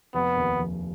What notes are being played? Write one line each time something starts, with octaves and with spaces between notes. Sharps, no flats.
F1 B3
D#2
F1